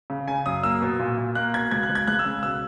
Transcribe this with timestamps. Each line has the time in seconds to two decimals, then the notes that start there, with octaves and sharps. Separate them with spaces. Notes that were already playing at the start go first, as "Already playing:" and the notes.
0.10 C#3
0.28 C#3 G#5
0.46 F#2 D#6
0.63 A#3 E6
0.82 B2
0.99 A#2
1.18 A#2
1.35 A#3 F#6
1.53 B2 G#6
1.71 C#2 G#6
1.83 F#6
1.89 C#2
1.95 G#6
2.07 C#2 F#6
2.19 E6
2.25 C#3
2.43 B2 E6